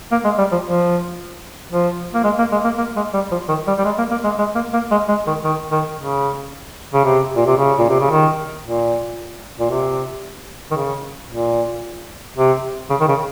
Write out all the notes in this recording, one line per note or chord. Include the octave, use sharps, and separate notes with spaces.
A#3
G#3
G3
F3
F3
F3
A#3
G#3
A#3
G#3
A#3
A#3
G#3
G3
F3
D#3
G3
G3
G#3
A#3
A#3
G#3
G#3
A#3
A#3
G#3
G#3
D#3
D#3
D#3
C#3
C#3
C3
A#2
C3
C#3
A#2
C3
C#3
D#3
A#2
A#2
C3
D#3
C#3
A#2
C3
C#3
D#3
C#3